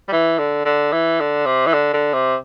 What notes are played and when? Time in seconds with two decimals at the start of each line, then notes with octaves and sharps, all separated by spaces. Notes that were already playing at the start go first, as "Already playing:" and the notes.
0.08 G3
0.12 E3
0.39 D3
0.65 D3
0.92 E3
1.20 D3
1.46 C3
1.66 E3
1.73 D3
1.93 D3
2.14 C3